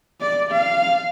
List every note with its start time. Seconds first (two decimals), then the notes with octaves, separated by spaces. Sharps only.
0.21 D5
0.52 F5